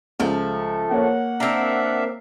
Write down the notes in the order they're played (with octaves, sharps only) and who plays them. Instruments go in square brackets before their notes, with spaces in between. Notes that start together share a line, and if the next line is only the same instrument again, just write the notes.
[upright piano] C#2 [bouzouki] F3 A3
[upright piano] A#3 C#5 [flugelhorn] F#5
[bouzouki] C4 A#4 [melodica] D4 E5 F5